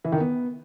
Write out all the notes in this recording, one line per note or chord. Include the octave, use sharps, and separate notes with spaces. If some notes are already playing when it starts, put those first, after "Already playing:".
E3
D#3
B3